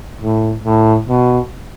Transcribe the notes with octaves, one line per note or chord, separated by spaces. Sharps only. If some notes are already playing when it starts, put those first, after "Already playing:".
A2
A2
B2